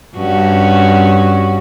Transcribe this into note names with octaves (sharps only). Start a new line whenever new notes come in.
G2 C#4 F#4